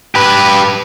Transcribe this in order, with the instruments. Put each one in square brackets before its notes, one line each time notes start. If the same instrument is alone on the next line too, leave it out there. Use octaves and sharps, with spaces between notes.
[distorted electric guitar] G4 B4